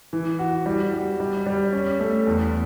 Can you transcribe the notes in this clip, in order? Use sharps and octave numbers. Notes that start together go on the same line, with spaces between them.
E3
F#4
G3
G3
G3
G3
C#4
A3
E2